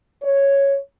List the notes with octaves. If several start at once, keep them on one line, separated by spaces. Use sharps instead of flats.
C#5